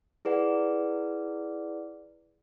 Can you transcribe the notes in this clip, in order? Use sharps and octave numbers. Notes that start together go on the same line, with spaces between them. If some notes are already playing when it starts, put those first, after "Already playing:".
E4 G#4 B4 D5 F#5